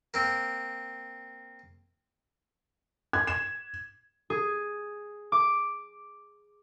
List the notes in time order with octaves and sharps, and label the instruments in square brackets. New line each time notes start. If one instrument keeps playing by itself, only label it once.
[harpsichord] A#3 C4
[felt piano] G#6
E7
[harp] G#4
D6